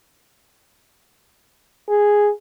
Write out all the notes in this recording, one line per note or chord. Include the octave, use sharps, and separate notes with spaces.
G#4